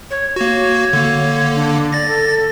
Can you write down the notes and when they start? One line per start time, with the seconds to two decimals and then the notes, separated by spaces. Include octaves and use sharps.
0.11 C#5
0.36 A#3 F#4 C#5
0.93 D3 A#3
1.56 D4
1.93 D5 A6 A#6
2.08 A4